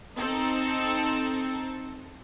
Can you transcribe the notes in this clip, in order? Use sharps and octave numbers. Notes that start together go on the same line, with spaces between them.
C4 D#4 A4